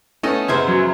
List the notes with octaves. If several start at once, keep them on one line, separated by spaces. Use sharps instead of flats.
A3 B3 C#4 A4 D#5 A5
F#2 C#3 B3 C5 E5 G#5
F#3